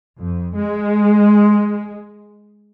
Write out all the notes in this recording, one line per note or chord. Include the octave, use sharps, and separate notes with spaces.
F2
G#3